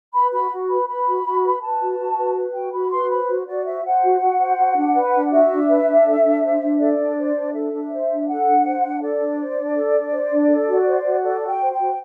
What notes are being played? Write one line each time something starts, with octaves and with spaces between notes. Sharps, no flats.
B4 B5
F#4 B5
F#4
B4 B5
B4 B5
F#4
F#4
B4
B4 A5
F#4
F#4
B4
B4
F#4 G5
F#4 B5
B4 C6
C5 B5
F#4
F#4 D5
C5 E5
C5 F#5
F#4
F#4
C5
F#4
D4
B4
D4
F#4 E5
D4
B4
D4
A4
D4
C5
D4
A4 D5
D4
C5
D4
A4 E5
D4
C5
D4
A4 F#5
D4
C5
D4
A4 D5
D4
C5
D4
A4
D4
C5
D4
A4
F#4
C5
F#4
A4 D5
F#4
G5
C5
G5
F#4